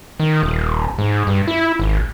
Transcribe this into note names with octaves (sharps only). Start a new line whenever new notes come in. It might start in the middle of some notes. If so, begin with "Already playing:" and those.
D#3
D#1
G#2
G2
E4
G#1